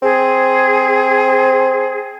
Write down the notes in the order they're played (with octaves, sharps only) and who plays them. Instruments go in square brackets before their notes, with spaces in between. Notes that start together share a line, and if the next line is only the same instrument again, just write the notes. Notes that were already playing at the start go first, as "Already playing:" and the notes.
[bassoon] C4 [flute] G#4